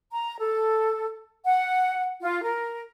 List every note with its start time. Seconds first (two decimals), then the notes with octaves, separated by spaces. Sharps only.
0.12 A#5
0.40 A4
1.46 F#5
2.21 F4
2.42 A#4